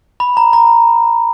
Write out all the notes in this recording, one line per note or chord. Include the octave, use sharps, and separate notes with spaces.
B5
A#5
A#5